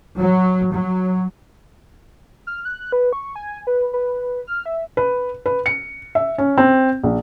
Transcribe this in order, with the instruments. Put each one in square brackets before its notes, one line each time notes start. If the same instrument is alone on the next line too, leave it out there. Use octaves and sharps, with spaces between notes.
[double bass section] F#3
F#3
[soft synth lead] F6
F#6
B4
C#6
G#5
B4
B4
F6
E5
[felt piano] B4
B4
C#7
E5
C#4
C4
A#1